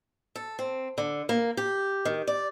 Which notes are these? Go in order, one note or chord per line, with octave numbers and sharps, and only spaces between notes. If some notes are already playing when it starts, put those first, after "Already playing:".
A4
C4
D3
A#3
G4
D#3
D5